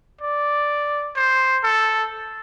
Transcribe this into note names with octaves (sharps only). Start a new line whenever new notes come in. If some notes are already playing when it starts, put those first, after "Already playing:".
D5
C5
A4